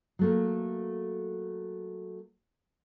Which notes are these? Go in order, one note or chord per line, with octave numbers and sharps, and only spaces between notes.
F#3 A3 A#3